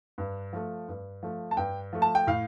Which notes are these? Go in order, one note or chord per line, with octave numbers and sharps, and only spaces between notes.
G2
F3 A3
G2
F3 A3
A5
G2 G5
F3 A3
A5
G5
A2 F5